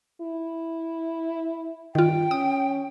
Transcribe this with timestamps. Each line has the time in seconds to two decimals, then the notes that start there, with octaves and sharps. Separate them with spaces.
0.21 E4
1.95 G2 D#3 F4 G5
2.31 C#4 D#6